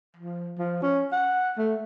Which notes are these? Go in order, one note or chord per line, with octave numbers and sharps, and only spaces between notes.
F3
F3
C#4
F#5
A3